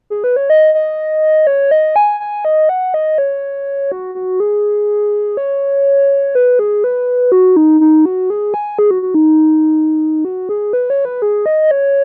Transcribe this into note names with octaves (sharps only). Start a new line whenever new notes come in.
G#4
B4
C#5
D#5
D#5
C#5
D#5
G#5
G#5
D#5
F#5
D#5
C#5
F#4
F#4
G#4
C#5
B4
G#4
B4
F#4
D#4
D#4
F#4
G#4
G#5
G#4
F#4
F#4
D#4
F#4
G#4
B4
C#5
B4
G#4
D#5
C#5